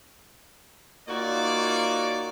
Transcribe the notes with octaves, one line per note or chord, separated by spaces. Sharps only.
A#3 D#4 F4 F#4 C#5 D5